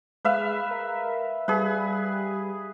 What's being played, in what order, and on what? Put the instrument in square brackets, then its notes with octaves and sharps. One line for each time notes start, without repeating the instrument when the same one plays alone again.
[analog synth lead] G#3 [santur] B4 E5 F5
[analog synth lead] A#4
[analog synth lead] G3 [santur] G#4 B4